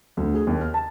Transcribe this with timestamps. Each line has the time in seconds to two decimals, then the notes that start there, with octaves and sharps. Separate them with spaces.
0.17 D2
0.34 G#4
0.47 D#2
0.61 F6
0.74 A5